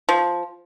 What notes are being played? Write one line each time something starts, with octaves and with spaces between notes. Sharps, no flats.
F3